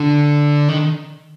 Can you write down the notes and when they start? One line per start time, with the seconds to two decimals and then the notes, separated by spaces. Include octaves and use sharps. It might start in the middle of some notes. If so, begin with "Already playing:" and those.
Already playing: D3
0.68 D#3